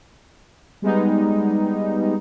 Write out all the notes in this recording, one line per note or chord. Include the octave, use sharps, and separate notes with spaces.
G3 G#3 B3 D#4